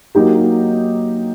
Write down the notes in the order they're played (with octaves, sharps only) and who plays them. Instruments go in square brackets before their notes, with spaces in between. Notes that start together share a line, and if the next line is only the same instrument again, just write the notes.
[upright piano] F#3 A#3 D#4 G4